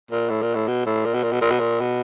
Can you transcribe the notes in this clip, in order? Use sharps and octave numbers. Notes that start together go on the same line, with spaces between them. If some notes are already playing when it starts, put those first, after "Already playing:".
A#2
A2
A#2
A2
B2
A2
A#2
B2
A#2
B2
A#2
B2
A#2
B2